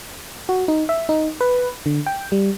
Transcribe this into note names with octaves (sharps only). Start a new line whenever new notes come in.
F#4
D#4
E5
D#4
B4
D3
G5
G3